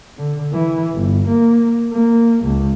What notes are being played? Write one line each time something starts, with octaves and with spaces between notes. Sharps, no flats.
D3
E3
G1
A#3
A#3
C#2